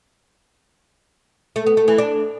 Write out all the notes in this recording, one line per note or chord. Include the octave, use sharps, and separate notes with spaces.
A3
B3
A3
E3
D4